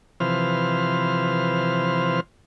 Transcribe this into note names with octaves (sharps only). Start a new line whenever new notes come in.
C3 E3 F3 B4 C5 F6